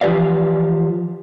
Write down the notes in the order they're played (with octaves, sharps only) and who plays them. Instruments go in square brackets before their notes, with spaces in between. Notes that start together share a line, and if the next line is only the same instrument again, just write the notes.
[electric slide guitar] E3 F3 G4 B4 D5 F5